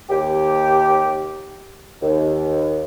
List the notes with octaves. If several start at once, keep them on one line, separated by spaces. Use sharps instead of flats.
D#2 G4
D#2